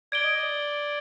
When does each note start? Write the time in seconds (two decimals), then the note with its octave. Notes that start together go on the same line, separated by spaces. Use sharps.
0.12 D5 G#6 D7 G7
0.24 D#5
0.35 D5